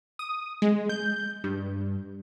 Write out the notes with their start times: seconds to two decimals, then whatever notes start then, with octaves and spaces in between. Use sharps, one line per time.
0.19 D#6
0.62 G#3
0.89 G6
1.44 G2